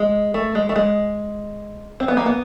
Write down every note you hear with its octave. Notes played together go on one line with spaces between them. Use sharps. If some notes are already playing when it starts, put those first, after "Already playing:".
Already playing: G#3
A3
G#3
A3
G#3
C4
B3
A#3
B3